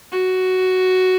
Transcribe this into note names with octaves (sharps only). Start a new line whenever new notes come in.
F#4